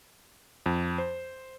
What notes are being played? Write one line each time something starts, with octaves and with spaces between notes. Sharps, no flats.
F2
C5